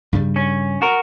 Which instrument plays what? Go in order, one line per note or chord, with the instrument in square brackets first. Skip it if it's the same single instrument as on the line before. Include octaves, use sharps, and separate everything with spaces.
[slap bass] G2 C#3 G3
[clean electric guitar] C#4
F#4 A#4